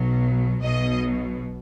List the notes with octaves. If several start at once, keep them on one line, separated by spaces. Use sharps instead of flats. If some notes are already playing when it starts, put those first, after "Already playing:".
Already playing: B1 B2 F#3
B1 B2 F#3 D#5